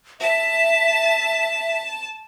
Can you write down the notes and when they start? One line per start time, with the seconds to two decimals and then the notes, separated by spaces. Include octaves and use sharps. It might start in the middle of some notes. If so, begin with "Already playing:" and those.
0.21 E5 A5